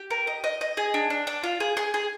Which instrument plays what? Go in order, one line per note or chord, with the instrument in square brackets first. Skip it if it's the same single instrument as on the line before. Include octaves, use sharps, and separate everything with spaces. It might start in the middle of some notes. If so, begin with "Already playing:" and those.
Already playing: [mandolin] G4
A#4
D#5
D#5
D#5
G#4
D4
D4
D4
F4
G#4
G#4
G#4